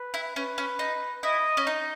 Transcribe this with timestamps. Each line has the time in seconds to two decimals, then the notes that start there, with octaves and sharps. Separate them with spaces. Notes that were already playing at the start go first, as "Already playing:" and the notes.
Already playing: B4
0.14 E4
0.36 C#4 B4
0.58 C#4
0.79 D#4
1.23 E4 D#5
1.57 C#4
1.67 D#4